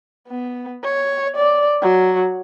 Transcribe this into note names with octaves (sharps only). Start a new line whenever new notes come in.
B3
C#5
D5
F#3